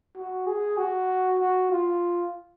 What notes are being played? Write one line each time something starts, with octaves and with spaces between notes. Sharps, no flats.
F#4
G#4
F#4
F#4
F4